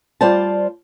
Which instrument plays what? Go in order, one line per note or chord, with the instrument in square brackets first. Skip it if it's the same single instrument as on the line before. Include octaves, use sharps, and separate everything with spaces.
[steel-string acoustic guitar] G3 F4 C5 D5 A5